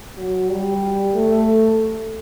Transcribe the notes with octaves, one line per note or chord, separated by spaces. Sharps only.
F#3
G3
A3